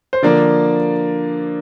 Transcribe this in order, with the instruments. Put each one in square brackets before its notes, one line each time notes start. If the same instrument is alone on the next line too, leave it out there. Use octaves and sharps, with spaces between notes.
[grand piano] C5
D3 F3 A#3 D5